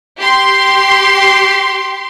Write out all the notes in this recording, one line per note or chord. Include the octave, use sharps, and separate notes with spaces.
G4 C6